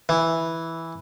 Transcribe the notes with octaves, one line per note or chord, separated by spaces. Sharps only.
E3